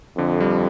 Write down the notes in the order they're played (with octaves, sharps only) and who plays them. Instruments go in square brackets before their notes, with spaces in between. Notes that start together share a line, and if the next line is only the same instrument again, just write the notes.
[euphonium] F2 [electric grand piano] D3
[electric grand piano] G3